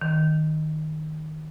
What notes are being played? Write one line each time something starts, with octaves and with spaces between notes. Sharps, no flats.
D#3